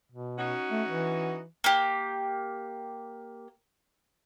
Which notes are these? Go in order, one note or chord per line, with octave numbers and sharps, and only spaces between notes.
B2
C#4 D#4 F#4
A3
E3
A#3 G4